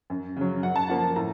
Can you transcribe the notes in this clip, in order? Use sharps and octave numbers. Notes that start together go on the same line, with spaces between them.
F#2
C#3 F#3
F#2 F#5
A5
F3 A#3 F#5
A2 A#5